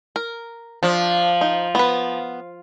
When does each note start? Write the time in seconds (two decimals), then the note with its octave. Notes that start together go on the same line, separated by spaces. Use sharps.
0.16 A#4
0.83 F3 D4
1.41 D#4
1.75 B3 B4